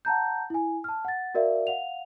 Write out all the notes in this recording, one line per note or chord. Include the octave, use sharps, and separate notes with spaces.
F#5 A5 A#5 G6
E4 G#5
A5 F6
F#5 A6
F#4 A#4 D5 E5 F5
F5 F#5 F7